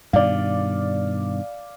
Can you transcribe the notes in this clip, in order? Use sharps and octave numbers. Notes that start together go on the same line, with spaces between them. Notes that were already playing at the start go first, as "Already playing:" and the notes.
G2 B2 D#3 D5 F5